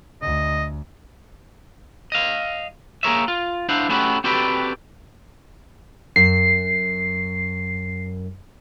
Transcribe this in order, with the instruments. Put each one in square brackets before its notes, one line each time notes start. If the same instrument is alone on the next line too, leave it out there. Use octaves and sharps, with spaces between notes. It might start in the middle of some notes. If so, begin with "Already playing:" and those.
[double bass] D2 [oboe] D#5
[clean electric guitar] D#5 F5
A#3 G#4 A#4 C#5 E5
F4
D4 E4 C5 F5 F#5
A3 B3 C#4 E4 F#4 G4
C4 F#4 G4 A4 B4 D5
[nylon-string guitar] F#2 [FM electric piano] C7